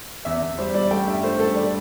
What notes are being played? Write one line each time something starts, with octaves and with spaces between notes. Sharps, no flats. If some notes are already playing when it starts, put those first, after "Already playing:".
E2 E5
E2
G3 C5
G3 D5
A3 G5
G2 E5
A3 C5
G2 A4
G3 D5